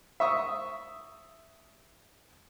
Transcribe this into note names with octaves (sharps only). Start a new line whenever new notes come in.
E5 C#6 D#6